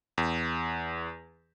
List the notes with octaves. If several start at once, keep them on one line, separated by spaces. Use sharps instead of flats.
E2